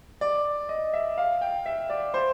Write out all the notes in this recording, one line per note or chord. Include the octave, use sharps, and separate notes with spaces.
D5
D#5
E5
F5
G5
E5
D5
C5